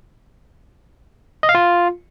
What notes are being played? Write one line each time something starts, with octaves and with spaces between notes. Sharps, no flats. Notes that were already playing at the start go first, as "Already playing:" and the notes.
D#5
F5
F4